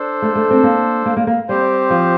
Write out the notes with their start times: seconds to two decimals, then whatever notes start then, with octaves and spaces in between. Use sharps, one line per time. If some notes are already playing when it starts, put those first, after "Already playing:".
Already playing: D4 A4 C5
0.22 A3
0.35 A3
0.51 C4
0.63 A#3
1.06 A#3
1.17 A#3
1.27 A#3
1.48 G3 C4 G4 C5
1.90 F3